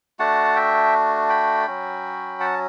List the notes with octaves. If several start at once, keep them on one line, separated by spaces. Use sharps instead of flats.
A3 D4 F#4 F#5 A5
E5 G5
G5 B5
F#3 C#4 F#4
F#5 A5